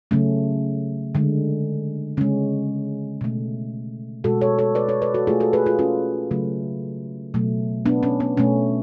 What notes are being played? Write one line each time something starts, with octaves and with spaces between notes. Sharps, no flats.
C#3 F#3 A3 C#4
D3 G#3
C#3 G#3 C#4
B2 A3
B2 G#3 F#4 A4
A4 C#5
A4 C#5
B4 D5
A4 C#5
B4 D5
F#4 A4
B2 A3 F4 G#4
F#4 A4
G#4 B4
F4 G#4
C#4 F4
C#3 F#3 A3
B2 F#3 A3
B3 D4
C#4
B3
B2 A3 C#4